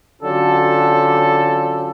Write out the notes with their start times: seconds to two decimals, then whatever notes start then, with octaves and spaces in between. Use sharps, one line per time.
0.22 D3 F#3 C#4 F4 G4 A4